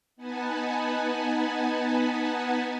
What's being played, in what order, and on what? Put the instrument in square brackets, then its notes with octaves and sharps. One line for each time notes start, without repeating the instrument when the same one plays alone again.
[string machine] B3 D#4 F#5 G#5 A5 B5